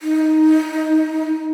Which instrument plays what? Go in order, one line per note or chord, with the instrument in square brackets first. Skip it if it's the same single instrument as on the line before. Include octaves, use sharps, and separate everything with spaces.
[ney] D#4